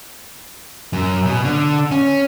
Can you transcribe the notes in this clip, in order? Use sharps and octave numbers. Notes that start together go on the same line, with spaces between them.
F#2
B2
D3
C#4